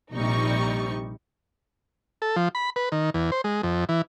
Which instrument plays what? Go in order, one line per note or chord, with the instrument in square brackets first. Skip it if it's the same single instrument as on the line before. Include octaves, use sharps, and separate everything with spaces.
[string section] A#1 C3 G3 D#4 C#6
[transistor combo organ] A4
F3
B5
B4
D#3
E2
C5
G#3
F2
E3